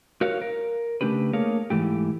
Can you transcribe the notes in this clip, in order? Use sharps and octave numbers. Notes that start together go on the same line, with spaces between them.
F#4 A#4 C#5 F5
A#4
C#3 A3 D4 G4 B4
A3 A#3 G#4 A#4 C#5 F5
G#2 C#3 E3 A3 G4